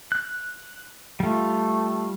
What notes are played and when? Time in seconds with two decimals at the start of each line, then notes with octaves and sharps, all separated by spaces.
0.12 F#6
1.20 G3 A3 F4